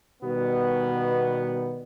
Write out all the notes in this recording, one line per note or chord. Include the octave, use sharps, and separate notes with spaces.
B2 D#3 G3 B3